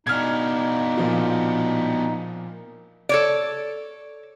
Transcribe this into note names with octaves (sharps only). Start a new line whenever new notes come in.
B2 D4 D#4 F6 G#6
A#2 F3 F4
A4 C#5 D5